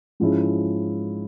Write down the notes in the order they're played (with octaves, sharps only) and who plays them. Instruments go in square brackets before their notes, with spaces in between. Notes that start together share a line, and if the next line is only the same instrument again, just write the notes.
[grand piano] G#2 F3 G#3 C#4 E4